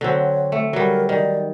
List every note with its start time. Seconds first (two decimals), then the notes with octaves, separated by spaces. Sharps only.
0.01 D3 F#3 C4 C#5
0.52 A3
0.73 F#3 G3 A#4
1.09 D#3 D5